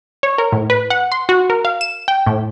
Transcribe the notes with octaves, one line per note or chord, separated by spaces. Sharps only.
C#5
A#4
A2
B4
F#5
C6
F#4
A#4
F5
E7
G5
A2